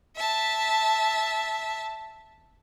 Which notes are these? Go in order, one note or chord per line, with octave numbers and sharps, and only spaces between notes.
E5 A5